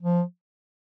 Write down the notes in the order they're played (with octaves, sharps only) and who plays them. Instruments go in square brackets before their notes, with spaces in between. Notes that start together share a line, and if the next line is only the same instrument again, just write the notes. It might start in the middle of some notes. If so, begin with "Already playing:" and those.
[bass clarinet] F3